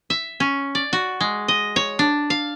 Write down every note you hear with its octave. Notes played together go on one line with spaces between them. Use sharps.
E5
C#4
D5
F#4
G#3
D#5
C#5
D4
F5